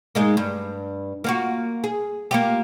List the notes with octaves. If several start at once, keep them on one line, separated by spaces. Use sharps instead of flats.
G#2 G#3 A#3
G2
A#3 F4 F#4
G#4
A#3 F4 G4